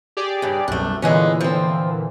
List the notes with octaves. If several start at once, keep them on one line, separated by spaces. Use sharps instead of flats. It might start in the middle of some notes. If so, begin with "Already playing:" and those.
G4 G#4 D5
G2 C#3
C2 F#2 B2 A3 D4
A#2 D3 E3 G#3 B3 C#4
F3 C4